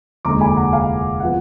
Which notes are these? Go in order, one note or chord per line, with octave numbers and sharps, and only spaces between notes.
F1 D#2 D3 G#3 A#5 D6
G#5 B5
F#5 A#5
F5 G#5
F3 B3 F#5